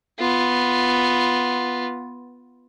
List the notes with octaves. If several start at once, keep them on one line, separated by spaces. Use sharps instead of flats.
B3 F4